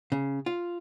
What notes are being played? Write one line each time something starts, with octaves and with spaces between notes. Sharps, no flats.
C#3
F4